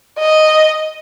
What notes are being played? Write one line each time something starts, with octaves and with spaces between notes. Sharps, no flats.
D#5